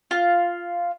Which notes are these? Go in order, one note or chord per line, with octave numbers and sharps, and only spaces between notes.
F4